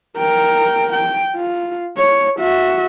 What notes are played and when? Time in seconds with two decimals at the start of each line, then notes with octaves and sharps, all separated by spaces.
0.18 A#4 G5
0.93 G5
1.36 F4
1.98 C#5
2.40 F#4 E5